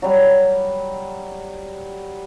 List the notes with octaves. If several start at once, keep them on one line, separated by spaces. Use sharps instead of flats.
F#3 G3